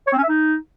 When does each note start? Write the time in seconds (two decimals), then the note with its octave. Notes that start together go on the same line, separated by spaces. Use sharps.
0.07 C#5
0.13 C4
0.18 C#4
0.23 E5
0.29 D#4